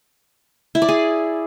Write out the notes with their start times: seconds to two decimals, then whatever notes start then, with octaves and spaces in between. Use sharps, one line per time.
0.75 E4
0.82 D5
0.88 G#4